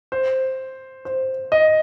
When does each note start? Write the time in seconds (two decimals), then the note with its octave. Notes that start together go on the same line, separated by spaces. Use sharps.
0.12 C5
1.05 C5
1.52 D#5